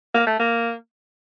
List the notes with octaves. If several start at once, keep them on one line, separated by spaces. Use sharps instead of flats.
A#3
A3
A#3